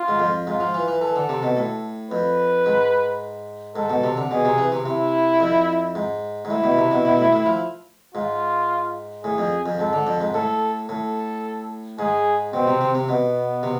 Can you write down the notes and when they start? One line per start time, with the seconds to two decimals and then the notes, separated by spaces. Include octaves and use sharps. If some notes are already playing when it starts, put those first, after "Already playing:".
Already playing: F4
0.08 G#2
0.19 F2
0.47 G#2 F4
0.60 F3
0.74 E3
0.88 E3
1.02 E3 A4
1.16 D3
1.29 C3
1.43 B2
1.57 A2
2.11 F2 B4
2.66 G#2
3.76 G#2 A4
3.90 B2
4.04 C3
4.17 D3
4.31 B2 G#4
4.45 C3
4.58 E3
4.72 C3
4.86 C3 E4
5.40 F2
5.95 G#2
6.45 G#2
6.50 A2 E4
6.64 B2
6.77 C3
6.91 B2
7.05 B2
7.19 A2
7.33 A2
7.46 F3
8.15 G#2 F4
9.24 A2 G#4
9.38 F2
9.66 F2
9.79 G#2 A4
9.93 D3
10.07 F2
10.21 G#2
10.34 A2 A4
10.89 A2 A4
11.99 G#2 G#4
12.53 B2 C4
12.67 C3
12.81 C3
12.95 C3
13.08 B2 B3
13.63 C3